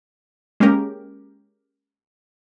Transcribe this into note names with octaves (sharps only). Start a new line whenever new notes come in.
G#3 A#3 C#4 G4 A#4